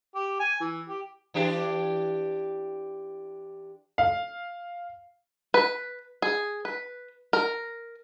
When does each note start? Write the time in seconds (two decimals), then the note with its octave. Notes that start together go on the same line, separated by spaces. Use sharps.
0.15 G4
0.40 G#5
0.60 E3
0.89 G4
1.34 E3 D4 G4
3.98 F5
5.54 B4
6.22 G#4
6.65 B4
7.33 A#4